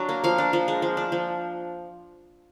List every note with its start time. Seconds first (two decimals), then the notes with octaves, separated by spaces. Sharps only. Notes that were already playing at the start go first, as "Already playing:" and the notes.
Already playing: F#3 D4
0.09 A#3
0.24 F3 F5
0.38 D4
0.53 F3
0.68 G#3
0.82 F3
0.97 D4
1.12 F3